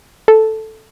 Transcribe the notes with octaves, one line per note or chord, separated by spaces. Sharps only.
A4